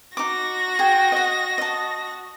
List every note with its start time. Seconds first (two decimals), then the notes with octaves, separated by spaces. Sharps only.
0.17 D#4 F#4 D6 A#6
0.79 G#4 G5
1.12 D#5 F#5
1.58 D#5 A5